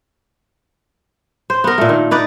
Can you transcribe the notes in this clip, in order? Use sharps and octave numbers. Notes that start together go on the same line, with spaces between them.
C5
B3 A#4
A#2 A3
D#3
D#4 B4 D5